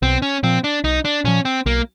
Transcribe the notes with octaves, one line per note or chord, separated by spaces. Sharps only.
B1 C4
C#4
A#2 F3 C4
D4
B1 D#4
D4
A#2 F3 C#4
C4
B1 A#3